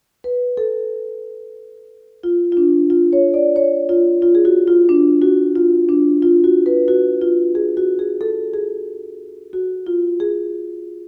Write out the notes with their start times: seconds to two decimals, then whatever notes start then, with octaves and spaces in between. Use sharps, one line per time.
0.24 B4
0.57 A4
2.23 F4
2.52 F4
2.57 D4
2.90 F4
3.13 C#5
3.34 D5
3.56 C#5
3.89 F4
4.22 F4
4.35 G#4
4.45 F#4
4.68 F4
4.89 D4
5.22 F#4
5.56 F4
5.89 D4
6.22 F4
6.44 F#4
6.66 B4
6.88 F#4
7.21 F4
7.55 G#4
7.77 F#4
7.99 G#4
8.21 A4
8.54 G#4
9.53 F#4
9.87 F4
10.20 G#4